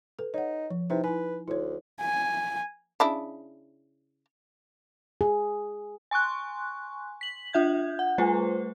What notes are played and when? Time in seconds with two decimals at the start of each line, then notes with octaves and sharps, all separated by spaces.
0.19 A4 B4
0.34 D#4 C#5 F#5
0.70 F3
0.90 C3 D#4 E4 B4
1.04 E4 B4 G#5
1.48 D2 E4 C#5
2.01 G#5
3.00 C#3 D4 E4
5.21 G#4
6.11 G#5 C6 C#6 F#6
7.21 B6 F#7
7.53 D4 F4 E5 G6 G#6
7.99 F#5
8.18 G3 A3 F4 B4 C5 G#5